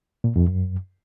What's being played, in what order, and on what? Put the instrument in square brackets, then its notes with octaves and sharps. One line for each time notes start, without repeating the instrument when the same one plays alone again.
[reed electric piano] A#2
F2
F#2